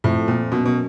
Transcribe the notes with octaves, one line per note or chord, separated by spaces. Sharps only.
F2 A2
A#2
F#2 B2
B2